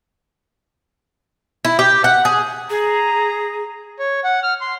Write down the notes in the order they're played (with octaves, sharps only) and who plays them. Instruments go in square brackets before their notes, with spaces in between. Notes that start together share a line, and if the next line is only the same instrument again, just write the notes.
[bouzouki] E4
G4
F#5
G#4
[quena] G#4 [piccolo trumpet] A#5
[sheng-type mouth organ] C#5
F#5
F6
C6